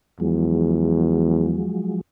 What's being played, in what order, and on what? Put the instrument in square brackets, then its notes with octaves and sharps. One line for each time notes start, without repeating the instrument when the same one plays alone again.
[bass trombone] E2 [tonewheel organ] F3 F#3 G#3